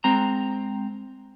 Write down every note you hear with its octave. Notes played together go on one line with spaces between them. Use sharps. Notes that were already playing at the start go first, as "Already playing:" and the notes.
G#3 C4 A#5